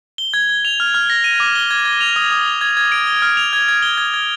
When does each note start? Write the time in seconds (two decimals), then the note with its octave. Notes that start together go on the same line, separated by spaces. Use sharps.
0.18 G7
0.34 G#6
0.49 G#6
0.65 F7
0.80 F6
0.94 F6
1.10 A#6
1.24 D#7
1.40 D6
1.55 G7
1.71 G#6
1.85 G#6
2.01 F7
2.16 D#6
2.32 D#6
2.46 F7
2.61 G#6
2.77 G#6
2.92 D7
3.07 G7
3.22 F6
3.37 F7
3.53 G#6
3.68 G#6
3.82 G7
3.98 G#6
4.14 G#6